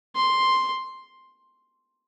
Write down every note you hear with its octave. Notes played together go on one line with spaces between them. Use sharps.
C6